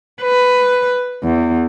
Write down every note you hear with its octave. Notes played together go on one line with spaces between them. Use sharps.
B4
E2